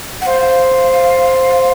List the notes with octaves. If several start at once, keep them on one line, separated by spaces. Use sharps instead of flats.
F#5
C5 F5